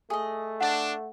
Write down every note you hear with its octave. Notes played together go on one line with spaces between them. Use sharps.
A3 G#4 D#5
D4 F#5